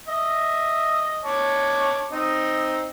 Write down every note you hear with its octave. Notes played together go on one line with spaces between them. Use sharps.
D#5 E5
C#5 A5 D6
C4 D#4 D#5